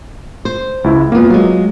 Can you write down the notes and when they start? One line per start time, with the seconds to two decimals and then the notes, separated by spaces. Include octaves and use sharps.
0.45 C5
0.84 C#2 E4
1.12 E2 A#3 B3 F4
1.30 F#3 G#3 F4